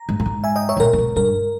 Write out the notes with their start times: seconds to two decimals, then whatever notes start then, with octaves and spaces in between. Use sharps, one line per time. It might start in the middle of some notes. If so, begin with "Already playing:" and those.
Already playing: A#5
0.09 G#2
0.20 A#2
0.26 G#2
0.44 E5 G#5
0.56 D#5 G5
0.69 C#5 E5
0.77 G#2
0.80 A#2 A#4
0.93 A#2
0.98 B2
1.16 G2 A#4